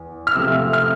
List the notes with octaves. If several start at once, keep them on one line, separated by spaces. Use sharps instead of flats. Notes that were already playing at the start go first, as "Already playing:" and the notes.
Already playing: E2
F6
C3 F3 A3 E6
F6